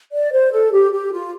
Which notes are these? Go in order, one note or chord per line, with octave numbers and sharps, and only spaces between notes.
D5
C5
A4
G4
G4
F4